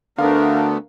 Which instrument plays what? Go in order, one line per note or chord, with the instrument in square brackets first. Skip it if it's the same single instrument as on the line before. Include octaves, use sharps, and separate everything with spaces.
[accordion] D2 A3 B3 [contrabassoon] D3 [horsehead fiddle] D4 A#4 [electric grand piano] F5